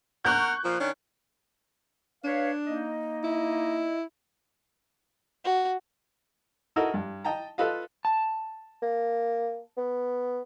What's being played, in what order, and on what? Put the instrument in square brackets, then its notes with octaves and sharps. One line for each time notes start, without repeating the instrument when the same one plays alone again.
[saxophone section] A#4 F#5 [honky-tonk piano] C#6 F#6 G6
[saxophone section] A#2 F3
D#3 C#4 D4
[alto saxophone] D4 [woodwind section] B4 C#5 F5
[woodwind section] A#3 D#4 D#5
[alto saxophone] E4
[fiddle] F#4
[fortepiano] D#4 E4 F#4 A4 A#4 D#5
G2
D#5 G5 A5 A#5
F4 A4 B4 D#5 F5
[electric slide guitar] A5
[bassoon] A#3
B3